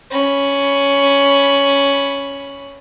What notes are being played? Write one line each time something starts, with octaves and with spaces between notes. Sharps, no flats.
C#4 B5